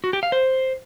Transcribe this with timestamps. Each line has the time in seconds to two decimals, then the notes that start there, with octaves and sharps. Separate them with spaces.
0.04 F#4
0.13 G4
0.23 F5
0.32 C5